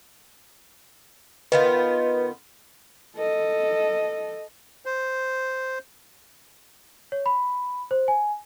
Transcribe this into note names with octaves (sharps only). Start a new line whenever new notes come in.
D#3 B3 F4 B4
A4 D#5
C5
C#5
B5
C5
G#5